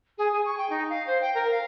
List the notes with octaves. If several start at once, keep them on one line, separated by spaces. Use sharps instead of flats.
G#4
G#4
C#6
G5
D#4
F5
C5
G5
A#4
F5